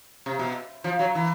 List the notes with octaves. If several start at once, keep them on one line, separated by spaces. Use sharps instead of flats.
C3
B2
F3
F#3
E3